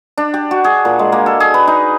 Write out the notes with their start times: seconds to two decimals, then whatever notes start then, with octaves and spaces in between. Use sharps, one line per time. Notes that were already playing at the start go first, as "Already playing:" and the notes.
0.18 D4
0.34 G4
0.51 F#4
0.64 G#4
0.85 A#2
0.99 G#3
1.12 A#3
1.26 A4
1.40 G#4
1.54 B4
1.67 D#4